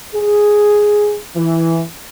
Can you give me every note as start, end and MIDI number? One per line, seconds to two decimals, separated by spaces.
0.14 1.17 68
1.36 1.80 52